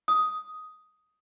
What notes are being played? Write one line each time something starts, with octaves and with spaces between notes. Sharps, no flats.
D#6